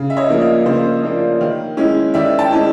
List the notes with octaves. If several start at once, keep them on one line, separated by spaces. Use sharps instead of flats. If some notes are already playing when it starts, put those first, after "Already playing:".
Already playing: C#3
E5
C#5 D#5
F3 A#3 D4
D#5 F5
C#3 C5 D5
F3 A#3 D4
D#3
G#3 C#4 E4
D#3 D5 E5
G5 A5
G#3 C#4 E4